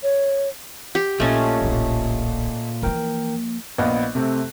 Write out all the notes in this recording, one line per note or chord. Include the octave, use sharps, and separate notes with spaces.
C#5
G4
A#1 A#2 A3 C#4 F4 D#5 A5
D1 A#1
E3 F3 A#3 A#4 G5
A#1 B3 D#5 F5 F#6
C3 A3 C4